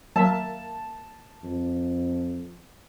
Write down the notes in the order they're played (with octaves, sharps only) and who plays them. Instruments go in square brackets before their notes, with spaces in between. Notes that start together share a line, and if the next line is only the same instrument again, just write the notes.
[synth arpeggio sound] F#3 [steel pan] A#3 E5 [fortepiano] A5
[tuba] F2